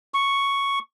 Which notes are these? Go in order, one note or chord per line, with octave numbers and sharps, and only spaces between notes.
C#6